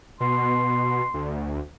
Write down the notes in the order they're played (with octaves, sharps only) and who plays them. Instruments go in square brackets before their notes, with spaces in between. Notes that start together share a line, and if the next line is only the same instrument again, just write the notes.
[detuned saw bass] B2 [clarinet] C6
[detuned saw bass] D2